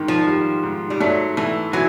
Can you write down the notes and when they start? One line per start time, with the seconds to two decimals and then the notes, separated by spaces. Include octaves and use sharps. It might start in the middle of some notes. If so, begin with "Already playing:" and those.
Already playing: G#2 D#3
0.08 F3
0.27 G3
0.63 G#2
0.90 G3
1.00 F#3 A3
1.37 E3 A3
1.73 E3 F#3